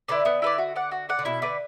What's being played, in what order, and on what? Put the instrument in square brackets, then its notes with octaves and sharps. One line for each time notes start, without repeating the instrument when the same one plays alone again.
[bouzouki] D3 [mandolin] E4 B4 D5
[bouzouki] D3 [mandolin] B3
[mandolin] E4 B4 D5
F#4
D5 F#5
F#4
D5 F#5
[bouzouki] D3
[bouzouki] B2 [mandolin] E4
[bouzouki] D3 [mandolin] B4 D5